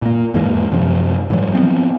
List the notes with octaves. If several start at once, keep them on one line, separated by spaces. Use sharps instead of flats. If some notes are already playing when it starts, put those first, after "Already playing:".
A#2 A#3
E2 G#2 E3 A#3
F#2 C3 F3
G#2 E3 F#3
F3 B3 C4